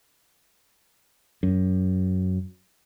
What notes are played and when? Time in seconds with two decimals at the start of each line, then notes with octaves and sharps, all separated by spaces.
1.43 F#2